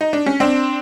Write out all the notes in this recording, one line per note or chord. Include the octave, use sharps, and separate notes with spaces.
D#4
D4
C#4
C4 D4